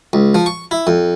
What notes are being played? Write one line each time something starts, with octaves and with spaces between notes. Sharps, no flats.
C#2
F3
C#6
E4
F2